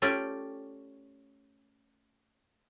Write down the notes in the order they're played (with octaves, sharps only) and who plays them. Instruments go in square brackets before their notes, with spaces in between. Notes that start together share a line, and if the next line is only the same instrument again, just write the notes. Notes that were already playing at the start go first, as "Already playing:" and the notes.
[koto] A3 C#4 F4 G4 D5 F5